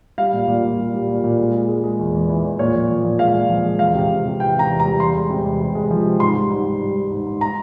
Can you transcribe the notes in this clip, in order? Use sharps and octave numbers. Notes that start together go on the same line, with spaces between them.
G3 F5
A#2
A#2
A#2
G3
G3
A#2
A#2
G#3
G#3
G#3
G#3
E2
E2
E3
E2
A#2 C#5
F3
F3
A#2
G#3 F5
A#2
F3
G#3
E2 F5
C3
C3
C3
E3 G5
C3 A#5
E2
A#5
G3
E2 C6
G#3
C3
E2
C3
G#3
F3
C3
G#2 C6
G3
G#2
G#2
G3
G3
G#2
G#2
A#5